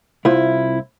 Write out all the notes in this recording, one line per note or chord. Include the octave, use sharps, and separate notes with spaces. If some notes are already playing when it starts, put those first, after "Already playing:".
C2 E4 F4